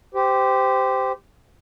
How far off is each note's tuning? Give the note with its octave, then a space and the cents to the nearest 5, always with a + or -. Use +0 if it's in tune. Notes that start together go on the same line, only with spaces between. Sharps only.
G4 +0 C5 -20